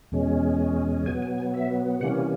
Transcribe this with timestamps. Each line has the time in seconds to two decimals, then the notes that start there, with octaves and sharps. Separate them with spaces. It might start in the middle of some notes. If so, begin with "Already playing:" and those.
0.12 E2 B2 G#3 C#4
1.06 B2 F#3 B3 G#5
1.22 G#5
1.38 G#5
1.54 E5
2.01 C3 E3 G3 A#3 C#4 F#5